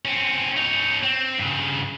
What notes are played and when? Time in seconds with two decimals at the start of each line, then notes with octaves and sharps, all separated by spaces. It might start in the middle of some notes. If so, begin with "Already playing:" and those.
0.05 C4 C#4
0.57 D#4 C#5
1.03 C4
1.38 G2 C#3